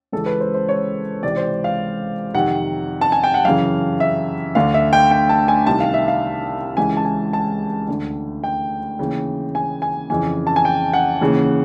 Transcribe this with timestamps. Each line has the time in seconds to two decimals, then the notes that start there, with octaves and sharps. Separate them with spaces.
0.12 C#2 C#3 E3 A4
0.26 B4
0.41 C5
0.54 C5
0.69 C#5
1.23 C#2 C3 E3 D5
1.37 C5
1.64 F5
2.34 F2 C3 D#3 F#5
3.01 A5
3.12 G#5
3.23 G5
3.34 F#5
3.45 F#2 C#3 E3 F5
4.00 E5
4.55 D2 D3 F5
4.74 E5
4.93 G5
5.11 G5
5.29 A5
5.48 G#5
5.66 C2 C3 D#3 A5
5.80 F5
5.94 E5
6.08 F5
6.77 C#2 C#3 E3 G#5
6.97 A5
7.05 G#5
7.33 A5
7.88 D2 D3
8.44 G5
8.99 D#2 C#3 E3
9.55 G#5
9.82 G#5
10.10 F2 C#3 E3 G#5
10.47 A5
10.56 G#5
10.65 G5
10.93 F#5
11.21 D#2 C#3 E3